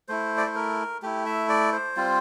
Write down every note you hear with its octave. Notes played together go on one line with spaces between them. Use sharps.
A3 E4 C5
D5
C5
A#4
A3 E4 G4
E5
D5
C5
G3 C4 F4